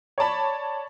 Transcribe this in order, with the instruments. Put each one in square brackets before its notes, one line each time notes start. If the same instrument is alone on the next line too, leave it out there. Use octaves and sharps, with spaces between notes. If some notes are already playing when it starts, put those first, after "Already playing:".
[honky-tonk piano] C#5 D5 A5 B5